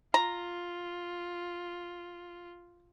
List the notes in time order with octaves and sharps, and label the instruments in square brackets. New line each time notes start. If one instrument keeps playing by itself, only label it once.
[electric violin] F4 [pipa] A#5